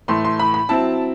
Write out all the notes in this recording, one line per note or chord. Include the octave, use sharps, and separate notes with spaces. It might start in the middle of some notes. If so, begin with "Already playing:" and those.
A2 E3 A3 C6
C6
B5
B5
F#3 C4 E4 A5